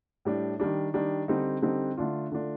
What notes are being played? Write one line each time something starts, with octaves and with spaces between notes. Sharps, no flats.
A2 G3 D4
D#3 G3 D4
D#3 G3 D4
D3 G3 C4 D#4
D3 G3 C4 D#4
D3 A3 D4 F4
D3 A3 D4 F4